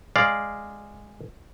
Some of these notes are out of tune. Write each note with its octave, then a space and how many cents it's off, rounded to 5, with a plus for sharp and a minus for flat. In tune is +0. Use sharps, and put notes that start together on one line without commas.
G#3 -10 D5 +0 F5 +0